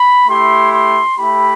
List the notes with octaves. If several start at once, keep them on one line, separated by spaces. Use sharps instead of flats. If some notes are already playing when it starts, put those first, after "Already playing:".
Already playing: B5
A3 E4 G4 C6
C6
A3 E4 G4 B5